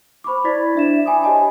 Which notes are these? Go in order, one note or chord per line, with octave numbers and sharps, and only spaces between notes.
C5 B5 C#6 D6
E4 C5 D5 G#6 A6 B6
D4 E5 E7
G5 G#5 B5 D6 D#6
G4 C5 C#5 D#5 G#5 A5